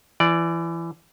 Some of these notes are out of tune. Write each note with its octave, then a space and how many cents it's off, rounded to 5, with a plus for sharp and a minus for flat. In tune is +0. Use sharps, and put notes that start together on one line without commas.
E3 +25 D5 +0